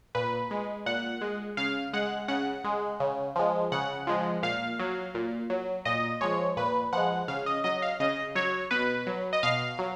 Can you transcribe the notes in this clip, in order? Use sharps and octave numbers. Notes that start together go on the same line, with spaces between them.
A#2 B4
G#3
A#2 F#5
G#3
C#3 F5
G#3 F#5
C#3 F#5
G#3
C#3
F3 G#3
C#3 F#5
F3 G#3
A#2 F5
F#3
A#2
F#3
A#2 D#5
F3 G#3 C#5
A#2 B4
F3 G#3 F#5
C#3 F5
D#5
F#3 D#5
F5
C#3 D#5
F#3 C#5
B2 B4
F#3
D#5
B2 F5
F#3